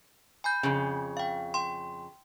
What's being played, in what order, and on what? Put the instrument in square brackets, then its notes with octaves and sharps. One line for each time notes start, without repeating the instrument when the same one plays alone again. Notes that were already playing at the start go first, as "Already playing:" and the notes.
[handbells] G#5 B5 G6
[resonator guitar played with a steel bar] F2 C#3
[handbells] F5 G5
G5 C6